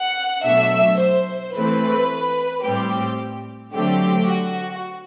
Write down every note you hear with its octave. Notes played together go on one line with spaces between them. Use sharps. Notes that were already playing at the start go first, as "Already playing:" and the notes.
Already playing: F#5
B2 F#3 A3 D4 E5
C5
E3 A3 C4 B4
A2 G3 C4 G4
D3 F#3 A3 C4 G4
F#4